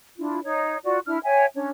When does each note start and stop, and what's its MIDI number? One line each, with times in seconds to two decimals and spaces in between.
0.18 0.39 62
0.18 0.39 64
0.18 0.39 65
0.43 0.78 63
0.43 0.78 73
0.84 0.98 65
0.84 0.98 66
0.84 0.98 74
1.06 1.18 62
1.06 1.18 64
1.06 1.18 89
1.24 1.45 73
1.24 1.45 76
1.24 1.45 79
1.24 1.45 80
1.55 1.70 61
1.55 1.70 62
1.55 1.70 73